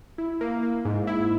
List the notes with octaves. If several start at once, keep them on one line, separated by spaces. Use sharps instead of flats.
E4
A#3
A#3
G#2
E4